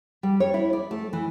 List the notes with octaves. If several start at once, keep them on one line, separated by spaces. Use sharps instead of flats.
G3
C#5
E4
D5
A3
E3